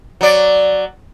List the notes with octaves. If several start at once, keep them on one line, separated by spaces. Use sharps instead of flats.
F#3 D5